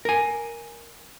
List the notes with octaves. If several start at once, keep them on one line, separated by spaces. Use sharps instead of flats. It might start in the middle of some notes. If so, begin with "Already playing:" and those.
A#4 G#5